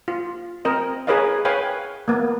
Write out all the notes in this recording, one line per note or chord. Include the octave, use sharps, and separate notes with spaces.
F4
C4 A#4 D#5
G#4 A#4 B4 C#5 D#5 F5
B4 C#5 F5 G5 G#5
A#3 B3